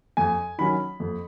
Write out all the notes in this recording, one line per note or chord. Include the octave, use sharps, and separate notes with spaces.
F2 G#5
D#3 F#3 C#4 B5
F2